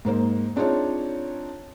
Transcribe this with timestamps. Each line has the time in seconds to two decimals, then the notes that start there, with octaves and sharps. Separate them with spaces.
0.05 G#2 A#3 C5
0.56 C4 D4 D#4 F4 G#4 C#5